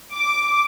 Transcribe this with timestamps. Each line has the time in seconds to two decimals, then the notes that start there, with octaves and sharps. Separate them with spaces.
0.15 D6